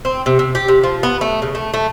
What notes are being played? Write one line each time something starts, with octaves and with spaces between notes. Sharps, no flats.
C4
C3
C3
G4
C3
F3
B3
A3
C#3
A3
A3